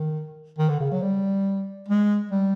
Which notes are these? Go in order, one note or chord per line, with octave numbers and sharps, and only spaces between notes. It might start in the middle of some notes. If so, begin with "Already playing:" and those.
Already playing: D#3
D#3
D3
C#3
F#3
G3
G#3
G3